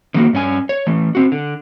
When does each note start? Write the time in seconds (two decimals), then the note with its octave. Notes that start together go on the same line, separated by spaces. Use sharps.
0.14 D3 D#3 F3 A3 A#3 F#4
0.33 G2 C#4 G#5
0.69 C#5
0.87 E3 A3
1.15 C4 F#4
1.32 D3